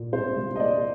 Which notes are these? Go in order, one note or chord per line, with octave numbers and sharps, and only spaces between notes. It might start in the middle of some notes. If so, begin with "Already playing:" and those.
Already playing: A#2 A#3
C2 C5
G3
D#5
A#3 D5